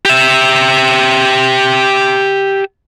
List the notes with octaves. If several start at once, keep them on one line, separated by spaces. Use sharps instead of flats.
G4 E5